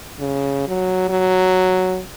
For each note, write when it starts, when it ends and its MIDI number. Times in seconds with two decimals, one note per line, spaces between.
0.20 0.67 49
0.68 1.08 54
1.09 2.00 54